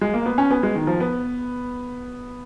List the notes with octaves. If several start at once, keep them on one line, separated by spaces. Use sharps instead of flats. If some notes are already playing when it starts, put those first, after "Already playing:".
G#3
A#3
B3
C#4
B3
G#3
D#3
F3
B3